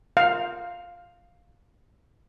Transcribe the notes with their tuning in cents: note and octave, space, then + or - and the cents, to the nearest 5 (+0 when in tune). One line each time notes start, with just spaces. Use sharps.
F5 +5